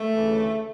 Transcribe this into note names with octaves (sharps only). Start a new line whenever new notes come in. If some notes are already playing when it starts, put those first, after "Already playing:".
Already playing: A3
D2 C#3 E3